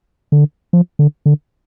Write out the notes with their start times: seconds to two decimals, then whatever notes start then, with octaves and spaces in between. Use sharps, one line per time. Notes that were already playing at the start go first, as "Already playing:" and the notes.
0.32 D3
0.73 F3
0.99 D3
1.26 D3